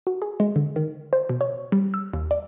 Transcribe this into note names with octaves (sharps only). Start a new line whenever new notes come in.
F#4
G#4
G#3
D3
D#3
C5
B2
C#5
G3
E6
D#2
D5